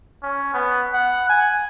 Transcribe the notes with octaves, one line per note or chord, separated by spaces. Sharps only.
C#4
B3
F#5
G#5